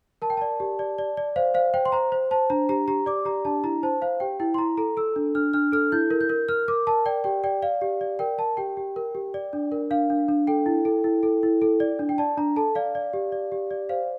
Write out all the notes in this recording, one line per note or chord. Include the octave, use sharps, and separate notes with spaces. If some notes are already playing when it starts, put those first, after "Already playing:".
A#4 A5
G5
D5 A5
G4
D5
D5
D5
C5 F5
C5 F5
C5 G5
C6
C5 A#5
C5
C5 A5
D4 A#5
G4 A#5
G4 A#5
D5 D6
G4 A#5
D4 A5
E4 A#5
C5 A5
C5 F5
G4 G5
E4 G5
C6
E4 A#5
A4 A#5
A4 E6
D4
D4 F6
D4 F6
A4 F6
E4 G6
A#4
G6
A#4
A#4 F6
A#4 D6
A#4 A5
D5 G5
G4 G5
D5 G5
D5 F5
G4
D5
A#4 G5
A#4 A5
G4 G5
G4
A#4
G4
D5
D4
A#4
D4 F5
D4
D4
A4 G5
E4
A4
E4
A4
E4
A4
D5
D4
G5
D5 A5
D4 A#5
A4 A5
D5 F5
D5
G4
D5
G4
D5
C5 F5